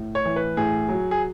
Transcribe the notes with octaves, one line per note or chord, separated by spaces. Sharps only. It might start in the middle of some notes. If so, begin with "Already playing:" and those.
Already playing: A2
C#5
E3
B4
A2 G#4
F#3
G#4